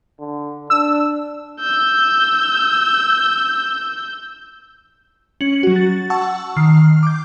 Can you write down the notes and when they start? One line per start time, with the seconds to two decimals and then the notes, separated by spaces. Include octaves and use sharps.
0.19 D3
0.70 D4 E6
1.61 E6 G6
5.41 C#4 C#7 F#7
5.63 F#3 F#4
5.76 A6
6.10 F#5 A5 C#6 E6
6.56 D#3 F6 C7
7.03 D6 G6